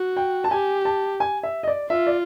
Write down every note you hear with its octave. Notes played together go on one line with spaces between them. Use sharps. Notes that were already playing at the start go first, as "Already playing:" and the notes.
Already playing: F#4
G5
A5
G4 G#5
A5
G#5
E5
D#5
D5
F4 E5
D5